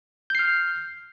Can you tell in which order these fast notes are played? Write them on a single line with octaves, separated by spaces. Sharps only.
G6 C7 F6